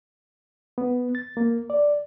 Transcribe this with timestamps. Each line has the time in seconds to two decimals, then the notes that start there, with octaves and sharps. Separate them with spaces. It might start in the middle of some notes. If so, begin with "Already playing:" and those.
0.78 B3
1.15 A6
1.37 A#3
1.70 D5